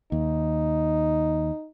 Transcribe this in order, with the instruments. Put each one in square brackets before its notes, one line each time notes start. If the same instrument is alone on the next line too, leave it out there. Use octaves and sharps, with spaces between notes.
[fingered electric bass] D#2 [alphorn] D#4